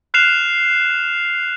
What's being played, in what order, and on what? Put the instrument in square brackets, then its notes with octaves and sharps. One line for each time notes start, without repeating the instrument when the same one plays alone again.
[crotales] F6 F#6 C7 E7 F7